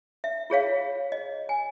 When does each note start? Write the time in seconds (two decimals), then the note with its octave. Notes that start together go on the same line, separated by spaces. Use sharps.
0.24 E5
0.50 F4 G#4 C#5 F5
1.12 D#5
1.49 G#5